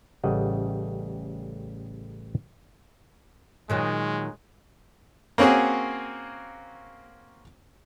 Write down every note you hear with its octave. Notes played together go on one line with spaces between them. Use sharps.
A1 C#3 G3 A3 D#5 F#5
A#2 D#3 F#3 G#3
A#3 C4 C#4 F#4 G#4